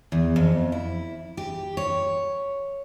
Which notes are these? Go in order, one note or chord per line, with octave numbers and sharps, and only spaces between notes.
E2
F2
E4
G4
C#5